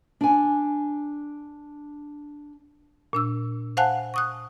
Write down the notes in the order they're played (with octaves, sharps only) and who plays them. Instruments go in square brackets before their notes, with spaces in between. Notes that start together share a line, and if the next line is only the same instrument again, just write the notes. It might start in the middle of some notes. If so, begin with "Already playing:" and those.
[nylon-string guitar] D4 G#5
[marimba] A#2 D4 E6
C5 F5 F#5 G#5 A5 F#6
C#6 D#6 F#6